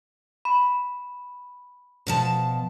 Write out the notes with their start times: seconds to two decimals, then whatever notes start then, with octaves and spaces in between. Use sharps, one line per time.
0.45 B5
2.07 B2 F3 A5